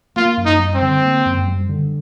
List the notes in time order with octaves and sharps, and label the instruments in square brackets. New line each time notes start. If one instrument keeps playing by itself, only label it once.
[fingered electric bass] A#3 [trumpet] F4
[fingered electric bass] F#2
[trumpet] D#4
[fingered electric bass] G3
[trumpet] C4
[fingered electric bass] D3
A#3
F#2
G3
D3